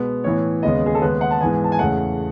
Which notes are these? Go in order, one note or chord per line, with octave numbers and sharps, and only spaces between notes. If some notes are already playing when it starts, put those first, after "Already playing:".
Already playing: B2 G#3 B3
A2 E3 B3 C#5
D#2 C#3 G#3 B3 D#5
G#4
A4
D#2 C#3 G#3 B3 B4
F#5
A5
G#2 E3 B3 G#5
A5
G#5
E2 C#3 E3 A3 F#5